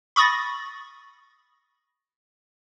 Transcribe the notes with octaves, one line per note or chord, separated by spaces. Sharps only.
B5 C#6 D#6 A6 A#6